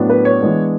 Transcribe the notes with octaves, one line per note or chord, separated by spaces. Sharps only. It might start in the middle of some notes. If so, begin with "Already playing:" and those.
Already playing: A2 F#3 B3 D4
B4
C#5
E3 G#3 B3 D4